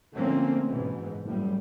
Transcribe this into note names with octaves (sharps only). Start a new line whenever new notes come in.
D3 F3 A3 A#3 C4 C#4
F#1 G#2 B2 E3
F#1 A2 G3